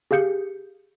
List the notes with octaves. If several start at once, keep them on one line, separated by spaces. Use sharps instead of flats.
G4 G#4 F5 G6 C#7